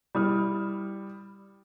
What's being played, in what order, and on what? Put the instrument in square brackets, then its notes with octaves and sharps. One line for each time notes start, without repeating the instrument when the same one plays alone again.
[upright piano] G3 E4 D#6 F6